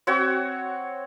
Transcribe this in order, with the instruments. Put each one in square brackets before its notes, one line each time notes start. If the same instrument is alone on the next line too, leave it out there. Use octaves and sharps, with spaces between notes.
[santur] C4 F#4 C#5